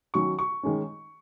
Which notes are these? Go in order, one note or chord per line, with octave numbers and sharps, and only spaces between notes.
D#3 F#3 C#4 C#6
C#6
D#3 G#3 C#4